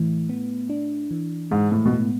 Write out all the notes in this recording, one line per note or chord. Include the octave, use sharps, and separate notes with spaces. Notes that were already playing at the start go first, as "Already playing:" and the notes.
Already playing: A2 E3
B3
D4
E3
G#2 G#3
A2
B2
A2 B3